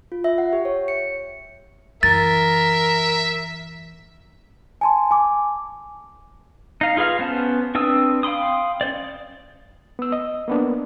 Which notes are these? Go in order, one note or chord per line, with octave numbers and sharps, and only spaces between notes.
F4
E5
F#5
G4
C#5
C#7
F#2 E3 A#4 E5 A6
G#5 A5 C6
G#5 D6
D#4 F5
F4 G#4 B4 F5 F6
B3 C#4 C5 A5
C4 D4 B4 D#6 E6
F5 G5 B5 C6 D#6
C#4 C5 D5
B3 E6
D#5
A#3 B3 D4